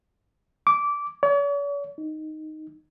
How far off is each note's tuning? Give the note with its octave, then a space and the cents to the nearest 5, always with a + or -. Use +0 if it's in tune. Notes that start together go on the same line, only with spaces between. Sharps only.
D6 -15
C#5 +45
D#4 -5